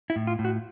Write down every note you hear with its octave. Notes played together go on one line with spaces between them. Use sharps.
E4
A2
F4
A2
F#4